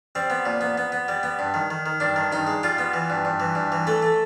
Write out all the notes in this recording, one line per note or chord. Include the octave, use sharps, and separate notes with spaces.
G3 C4
B3
A#2
B3
B3
B3
G3
B3
G2
D#3
D#3
D#3
G2 D4
D#3
G2 D#4
G#3
G3 F4
B3
E3
G2
G2
E3
G2
E3
A3 A4
A3